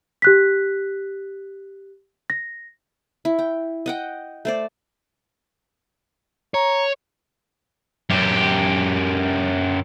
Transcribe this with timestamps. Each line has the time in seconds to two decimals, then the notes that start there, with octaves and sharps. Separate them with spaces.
0.22 G4 F#6 B6
2.30 A#6
3.25 E4
3.39 G5
3.86 D#5 F#5 G5
4.45 A3 C5 D5
6.54 C#5 A#5
8.10 F#2 G4